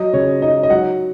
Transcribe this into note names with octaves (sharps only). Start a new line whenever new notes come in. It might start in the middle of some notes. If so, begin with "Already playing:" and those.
Already playing: F#3 D#5
C#3 C#5
D#4 D#5
D#5
F#3 F#5